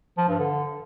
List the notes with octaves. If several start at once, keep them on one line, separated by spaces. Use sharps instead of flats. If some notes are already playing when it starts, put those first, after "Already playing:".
F3
G2
D3